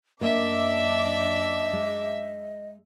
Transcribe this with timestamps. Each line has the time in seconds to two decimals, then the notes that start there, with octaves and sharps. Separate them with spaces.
0.21 F#2 A#3 D4 A#4 D#5 E5 D6
1.73 G#3